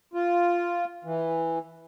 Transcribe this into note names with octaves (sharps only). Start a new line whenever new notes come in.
F4
E3